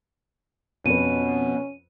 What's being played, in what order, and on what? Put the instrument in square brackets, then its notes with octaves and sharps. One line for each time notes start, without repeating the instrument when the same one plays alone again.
[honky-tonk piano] F2 B4 [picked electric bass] B2 [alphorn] C#4 [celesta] D#7